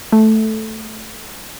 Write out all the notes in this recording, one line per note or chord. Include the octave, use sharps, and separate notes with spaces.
A3